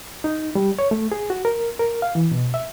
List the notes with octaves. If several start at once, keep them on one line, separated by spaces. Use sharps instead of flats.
D#4
G3
C#5
A3
G#4
F#4
A#4
A#4
F5
E3
B2
E5